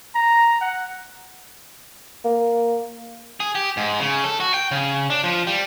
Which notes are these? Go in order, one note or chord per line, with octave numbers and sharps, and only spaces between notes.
A#5
F#5
A#3
G#4
G4
G#2
C#3
A4
F#4
G5
C#3
D4
F3
G3